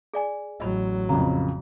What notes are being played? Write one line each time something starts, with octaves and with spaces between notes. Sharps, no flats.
G#4 D5 G#5
A1 F#3 D#5 B5
F2 C#3 A#5